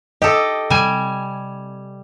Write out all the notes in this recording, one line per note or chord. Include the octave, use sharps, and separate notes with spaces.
G4 A4 D#5
C3 G3 G#5